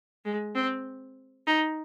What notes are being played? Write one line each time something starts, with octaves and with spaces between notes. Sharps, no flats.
G#3
C4
D#4